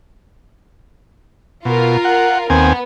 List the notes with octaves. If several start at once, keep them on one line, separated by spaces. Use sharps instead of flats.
B2 F4 A#4
F#5
D#2 B3 C4 G#5